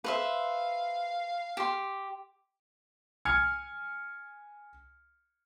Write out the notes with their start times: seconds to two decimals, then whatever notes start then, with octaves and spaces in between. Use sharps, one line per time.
0.04 B4 C5 E5 F5
1.57 G4 C6
3.25 G#5 F6 G#6 C#7